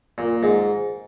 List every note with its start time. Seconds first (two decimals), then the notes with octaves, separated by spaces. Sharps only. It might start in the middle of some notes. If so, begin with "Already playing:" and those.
0.18 A#2
0.43 G#2